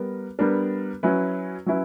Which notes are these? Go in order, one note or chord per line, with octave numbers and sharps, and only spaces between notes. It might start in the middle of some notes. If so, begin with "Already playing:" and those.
Already playing: G3 B3 A#4
G3 B3 D4 A#4
F#3 C#4 E4 B4
F#3 C#4 E4 B4